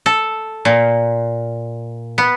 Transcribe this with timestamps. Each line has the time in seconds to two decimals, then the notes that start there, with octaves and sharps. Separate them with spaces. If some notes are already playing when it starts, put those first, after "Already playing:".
0.06 A4
0.65 A#2
2.18 B3